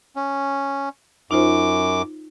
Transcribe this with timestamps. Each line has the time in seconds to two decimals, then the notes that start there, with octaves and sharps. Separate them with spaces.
0.16 C#4
1.31 F#2 D#4 F4 C5 D6